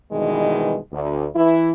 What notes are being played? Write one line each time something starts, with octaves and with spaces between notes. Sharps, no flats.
G2 B2 D#3 E3 G3 G#3
D2
E3 E4